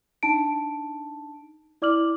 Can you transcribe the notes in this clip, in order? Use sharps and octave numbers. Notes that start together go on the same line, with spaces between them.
D4 D#4 A5 D7
E4 D5 D6 F6 F#7